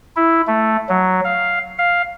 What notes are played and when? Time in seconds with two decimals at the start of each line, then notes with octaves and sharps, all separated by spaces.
0.16 E4
0.47 A3
0.89 F#3
1.24 F5
1.78 F5